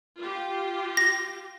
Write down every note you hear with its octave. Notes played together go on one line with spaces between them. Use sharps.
F4 G4
A#6